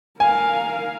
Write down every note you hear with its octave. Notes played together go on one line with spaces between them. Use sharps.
A#4 F5 G#5